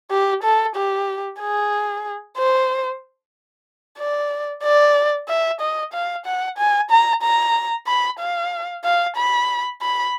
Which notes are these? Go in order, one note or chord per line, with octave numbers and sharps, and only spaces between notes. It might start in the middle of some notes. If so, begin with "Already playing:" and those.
G4
A4
G4
G#4
C5
D5
D5
E5
D#5
F5
F#5
G#5
A#5
A#5
B5
F5
F5
B5
B5